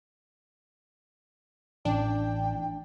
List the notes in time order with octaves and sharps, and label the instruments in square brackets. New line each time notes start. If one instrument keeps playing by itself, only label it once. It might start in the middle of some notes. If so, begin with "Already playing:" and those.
[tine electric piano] A1 [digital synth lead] D4 [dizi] G5